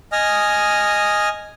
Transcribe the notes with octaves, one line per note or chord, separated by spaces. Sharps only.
D#5 G#5 D#6 F6